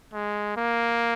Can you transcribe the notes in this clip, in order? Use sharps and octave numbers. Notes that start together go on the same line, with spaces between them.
G#3
A#3